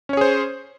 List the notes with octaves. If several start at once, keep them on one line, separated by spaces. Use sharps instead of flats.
C#4 G#4 C5 C#5